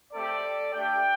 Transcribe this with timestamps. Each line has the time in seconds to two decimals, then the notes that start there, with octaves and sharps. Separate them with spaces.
0.13 A3 C4 G4 A4 D5
0.74 A3 D4 G4 D5 G5